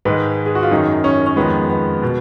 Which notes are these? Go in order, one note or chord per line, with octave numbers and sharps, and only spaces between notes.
G#2 D#3 G#3 B4
G#4
F#4
F4
F#2 D#3 F#3 D#4
C#4
C#4
F2 D#3 G#3 B3
B3
B2